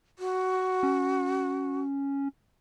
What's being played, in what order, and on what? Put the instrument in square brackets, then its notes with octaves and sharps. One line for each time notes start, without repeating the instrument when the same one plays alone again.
[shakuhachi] F#4
[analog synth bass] C#4